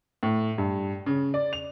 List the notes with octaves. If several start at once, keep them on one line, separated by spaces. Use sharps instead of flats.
A2
G2
C#3
D5
F7